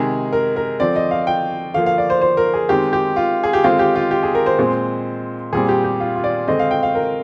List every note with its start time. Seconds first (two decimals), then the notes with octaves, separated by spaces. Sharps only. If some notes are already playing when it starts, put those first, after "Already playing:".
Already playing: C3 D#3 G#3 G#4
0.33 A#4
0.56 A#4
0.80 D3 F3 C4 D5
0.96 D#5
1.11 F5
1.27 G5
1.74 D3 F3 A#3 F5
1.86 F5
1.98 D5
2.10 C5
2.21 C5
2.37 A#4
2.54 G#4
2.69 D#3 G#3 C4 G4
2.93 G4
3.16 F4
3.43 G#4
3.53 G4
3.64 D3 G#3 C4 F4
3.79 G4
3.95 F4
4.11 G4
4.23 G#4
4.35 A#4
4.46 C5
4.58 A#2 G#3 C4
5.53 A#2 G3 C4 G#4
5.69 G4
5.84 G4
6.00 F4
6.16 F4
6.24 D5
6.48 D3 G#3 C4 D#5
6.59 F5
6.71 G5
6.83 F5
6.95 A#4